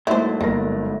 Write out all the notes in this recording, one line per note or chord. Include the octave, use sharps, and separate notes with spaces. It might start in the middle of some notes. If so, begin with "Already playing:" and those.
G#2 F#3 A3 A#3 E4 C5
G1 A#3 A#4 A#6